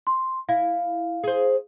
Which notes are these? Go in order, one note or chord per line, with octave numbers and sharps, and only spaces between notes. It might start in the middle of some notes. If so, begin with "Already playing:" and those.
C6
E4 F5
G#4 C5